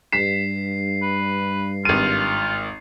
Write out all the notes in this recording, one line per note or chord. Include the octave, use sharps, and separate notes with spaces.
G2 B6 C7 E7
B4
G#1 F4 D#7